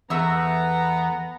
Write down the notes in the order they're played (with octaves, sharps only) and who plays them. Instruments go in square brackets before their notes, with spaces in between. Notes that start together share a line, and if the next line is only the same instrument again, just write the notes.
[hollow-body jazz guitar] E2 [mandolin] A3 E5 E6 [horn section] B3 A#5